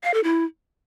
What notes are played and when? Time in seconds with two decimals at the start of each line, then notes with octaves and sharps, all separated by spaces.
0.04 F5
0.14 A4
0.24 E4